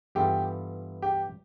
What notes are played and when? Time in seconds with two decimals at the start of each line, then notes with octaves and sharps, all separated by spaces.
0.15 G2 E3 B3 F4 G4 A4
1.02 G4